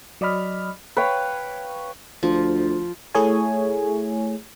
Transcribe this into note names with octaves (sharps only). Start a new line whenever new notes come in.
F#3 D5 D#5 B5 F6
B4 C#5 F5 G5
D2 F3
A3 E4 G#4 C#5 G#5